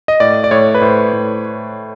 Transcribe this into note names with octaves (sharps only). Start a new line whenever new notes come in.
D#5
A2 D5
D5
A2 C#5
B4
A2 C5
A2